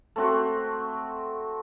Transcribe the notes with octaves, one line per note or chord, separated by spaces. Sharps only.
A3 C4 F#4